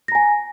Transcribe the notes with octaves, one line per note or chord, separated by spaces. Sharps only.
G#5 A#5 A#6